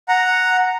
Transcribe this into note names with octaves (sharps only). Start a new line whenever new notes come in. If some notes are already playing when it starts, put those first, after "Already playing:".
F#5 A#5